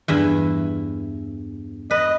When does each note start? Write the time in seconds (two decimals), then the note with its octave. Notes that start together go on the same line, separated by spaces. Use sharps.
0.08 E2 G2 E4
1.91 B4 D#5